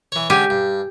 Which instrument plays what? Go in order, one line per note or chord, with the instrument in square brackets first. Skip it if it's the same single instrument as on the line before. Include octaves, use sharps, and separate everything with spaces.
[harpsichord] E3 C#5
[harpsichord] D3 G#3 C#4 [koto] G4 G#5
[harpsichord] G2